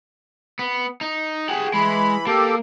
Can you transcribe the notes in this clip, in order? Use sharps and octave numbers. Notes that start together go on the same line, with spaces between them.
B3
D#4
G4 G#4 F#5
E3 G#3 B5
A#3 G4 A4